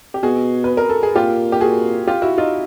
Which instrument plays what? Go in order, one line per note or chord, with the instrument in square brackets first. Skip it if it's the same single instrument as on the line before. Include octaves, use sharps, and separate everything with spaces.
[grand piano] G4
[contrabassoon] B2 [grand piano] F#4 G#4
[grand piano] B4
A#4
A4
G#4
[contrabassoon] A#2 [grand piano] F4 G4
[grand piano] G4
F#4 G#4
F4 G4
E4 F#4
D#4 F4